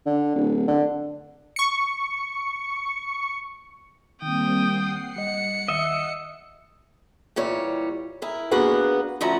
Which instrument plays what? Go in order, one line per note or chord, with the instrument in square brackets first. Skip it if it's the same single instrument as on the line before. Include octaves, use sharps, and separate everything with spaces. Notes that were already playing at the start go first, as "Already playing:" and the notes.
[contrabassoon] D3
D1
D3
[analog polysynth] C#6 C#7
[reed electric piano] D#3 [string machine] G3 A#3 C4 [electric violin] G5 D#6
[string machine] F#5 C7
[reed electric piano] G3 D#5 [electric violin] C#7
[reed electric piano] D#2 D#3 [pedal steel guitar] D#5 E5
[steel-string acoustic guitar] A#2 E3 G3 C#5
E4 G#4 A#4
A#3 B3 D4 F#4 G#4 B4
D2 F3 C#4 E4 F#4 A#5